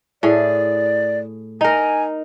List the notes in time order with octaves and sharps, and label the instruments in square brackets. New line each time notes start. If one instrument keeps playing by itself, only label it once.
[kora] A2 G#4 [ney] D5
[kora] D#4 A#4 [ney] G#5